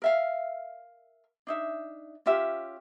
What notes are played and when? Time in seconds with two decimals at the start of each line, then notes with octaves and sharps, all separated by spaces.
0.02 A#4 E5 F5
1.47 D4 D#4 E5
2.26 C#4 F4 G4 E5